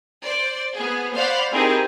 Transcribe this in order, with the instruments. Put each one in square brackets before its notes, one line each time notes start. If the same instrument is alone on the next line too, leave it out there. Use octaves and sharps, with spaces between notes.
[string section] C5 D5
B3 G#4
C5 D5 F5 F#5 B5
C4 D#4 E4 G4 G#4 A#4